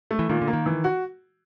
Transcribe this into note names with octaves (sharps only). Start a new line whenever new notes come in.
A3
E3
A#2 D#3
D3
A#3
D#3
E3
F#4